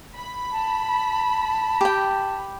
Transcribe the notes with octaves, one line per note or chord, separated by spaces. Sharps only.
B5
A5
G4 G5